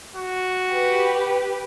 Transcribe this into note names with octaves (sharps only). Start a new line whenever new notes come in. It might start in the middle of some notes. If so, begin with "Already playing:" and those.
F#4
G4 B4